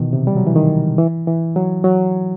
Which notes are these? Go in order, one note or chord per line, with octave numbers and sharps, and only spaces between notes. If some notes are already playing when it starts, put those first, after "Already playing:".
Already playing: B2 D#3 E3
C3
G3
F#3
E3
D#3
E3
E3
F#3
F#3